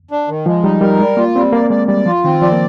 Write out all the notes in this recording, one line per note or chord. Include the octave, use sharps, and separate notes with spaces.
D4
D#3
F3 G#3
G3 D#4
G3 A#4
G3 G#3
A#3 F4
G3 C4
A#3 D5
G#3 D5
G3 D5
F3 F4
D#3 C4
F3 D5
A#3